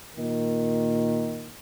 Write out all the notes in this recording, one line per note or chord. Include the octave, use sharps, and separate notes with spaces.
A#2 D#3